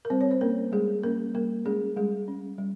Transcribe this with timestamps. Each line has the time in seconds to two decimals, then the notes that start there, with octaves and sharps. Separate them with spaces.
0.05 A#4
0.10 G3 C4 C5
0.21 C#5
0.31 C5
0.41 A#3 C#4 A#4
0.72 G3 G#3 G#4
1.03 A#3 C#4 A#4
1.34 G3 A#3 A#4
1.65 G#3 C#4 G#4
1.96 G3 G#3 G#4
2.28 C#4
2.58 G3